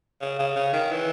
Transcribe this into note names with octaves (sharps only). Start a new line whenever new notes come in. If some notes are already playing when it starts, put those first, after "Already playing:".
C#3
C#3
C#3
D#3
E3